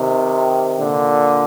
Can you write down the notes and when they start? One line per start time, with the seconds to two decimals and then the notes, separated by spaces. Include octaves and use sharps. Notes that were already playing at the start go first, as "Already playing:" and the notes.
Already playing: C3 D#3
0.80 A#2 D3